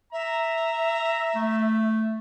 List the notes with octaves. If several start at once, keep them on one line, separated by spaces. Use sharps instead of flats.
E5 A#5
A3